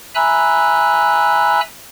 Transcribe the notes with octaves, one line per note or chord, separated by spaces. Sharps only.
E5 G#5 A#5 B5 E6 F#6